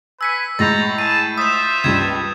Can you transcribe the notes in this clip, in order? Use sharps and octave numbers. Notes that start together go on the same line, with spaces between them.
B4 G#5 E6 B6 C#7
A2 G#3 F#4 A#5 G6 A6
G#4 A5 D#7
F4 C5 E5 D#6 E7
C#2 G2 G3 G#6